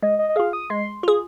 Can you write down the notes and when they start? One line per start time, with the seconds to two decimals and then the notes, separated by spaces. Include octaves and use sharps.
0.03 G#3 D#5
0.19 D#5
0.29 D#5
0.36 F4 G#4 F5
0.53 D#6
0.70 G#3 C6
1.03 F4 G#4